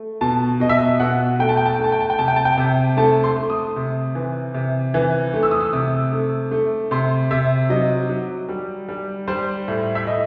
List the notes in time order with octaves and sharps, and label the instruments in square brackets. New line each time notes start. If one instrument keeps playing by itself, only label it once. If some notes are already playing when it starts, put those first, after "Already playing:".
Already playing: [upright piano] A3
B2 A5
B2 D#5
E5
D#5
B2 F#5
A3 G5
A5
G5
A5
G5
A3
A5
G5
A5
G5
C3 A5
G5
A5
G5
C3
A3 A5
C6
A3
D#6
C3
E3
C3
E3
A3
E6
D#6
E6
C3 D#6
A3
A3
C3 C6
C3 E5
F#3 D#5
F#3
G3
G3
G3 C5
A2
E5
A2 D#5